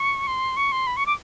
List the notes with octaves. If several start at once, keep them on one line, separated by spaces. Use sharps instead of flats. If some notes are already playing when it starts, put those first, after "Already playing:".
Already playing: C#6
C6
C#6
C6
B5
C#6
D6